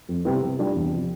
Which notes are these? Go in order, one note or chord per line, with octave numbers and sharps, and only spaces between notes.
F2
C3 G3 B3 E4
C3
G3 D4 F4
E2
C3 F3